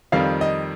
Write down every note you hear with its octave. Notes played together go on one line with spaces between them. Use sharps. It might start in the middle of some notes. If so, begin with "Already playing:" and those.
F2 D#3 G3 F5
D#5